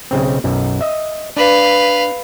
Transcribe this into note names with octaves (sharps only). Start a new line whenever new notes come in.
B1 C#3 C4
B1 F#2
D#5 E5
D4 B4 F5